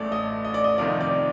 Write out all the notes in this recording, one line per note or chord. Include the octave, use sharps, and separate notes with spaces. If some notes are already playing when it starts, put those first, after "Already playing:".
Already playing: A1 A2 A3 D5
D#5
D#5
D5
D#5
F1 F2 C3 D#3 D5
D5